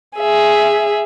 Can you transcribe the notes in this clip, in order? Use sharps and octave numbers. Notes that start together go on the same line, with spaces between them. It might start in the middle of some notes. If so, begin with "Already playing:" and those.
G#4 E5